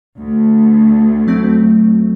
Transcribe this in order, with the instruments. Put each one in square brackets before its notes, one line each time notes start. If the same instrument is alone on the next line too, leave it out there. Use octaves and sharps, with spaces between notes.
[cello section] D2
[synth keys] F#3 A3 C4